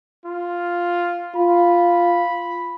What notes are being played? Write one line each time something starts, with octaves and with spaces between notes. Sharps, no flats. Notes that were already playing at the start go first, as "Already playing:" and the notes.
F4
F4 B5